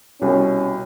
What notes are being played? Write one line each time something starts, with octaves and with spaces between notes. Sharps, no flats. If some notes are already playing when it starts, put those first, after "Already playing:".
C2 B2 C#4